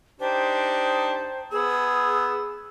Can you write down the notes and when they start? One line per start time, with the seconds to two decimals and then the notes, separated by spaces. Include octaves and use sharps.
0.20 D4 D#4 G4 C5
1.51 B3 G#4 E6